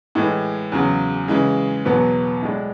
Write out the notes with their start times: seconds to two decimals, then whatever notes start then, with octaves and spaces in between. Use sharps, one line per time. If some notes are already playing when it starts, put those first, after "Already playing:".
0.15 A2 E3 G#3
0.72 E2 C#3 F#3
1.28 C#3 E3 G#3
1.85 E2 B2 F#3 B3
2.42 A2 G#3 D4